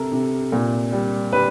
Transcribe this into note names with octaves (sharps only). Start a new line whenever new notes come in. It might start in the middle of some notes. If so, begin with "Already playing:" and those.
Already playing: C3 A4 A#4
C3
A#2
G3
G3 B4